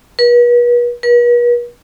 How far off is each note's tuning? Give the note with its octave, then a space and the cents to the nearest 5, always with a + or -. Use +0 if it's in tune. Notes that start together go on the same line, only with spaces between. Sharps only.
B4 -40
B4 -45